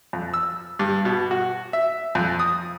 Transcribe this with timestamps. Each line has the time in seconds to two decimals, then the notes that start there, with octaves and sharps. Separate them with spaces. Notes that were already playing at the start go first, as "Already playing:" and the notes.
0.13 F2
0.34 E6
0.79 G2
1.05 B2
1.31 F#4
1.73 E5
2.15 F2
2.39 D#6